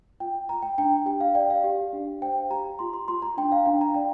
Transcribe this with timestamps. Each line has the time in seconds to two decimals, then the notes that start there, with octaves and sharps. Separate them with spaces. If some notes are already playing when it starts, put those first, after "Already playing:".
0.20 F4 G5
0.48 F4 A#5
0.62 G5
0.78 D4 G5
1.06 G4 G5
1.21 F5
1.35 D5 G5
1.50 F5
1.64 G4
1.93 D4
2.21 C5 G5
2.50 G4 A#5
2.79 F4 C6
2.93 C6
3.08 F4 C6
3.22 A#5
3.37 D4 G5
3.52 F5
3.66 D4 G5
3.81 A#5
3.94 D5 G5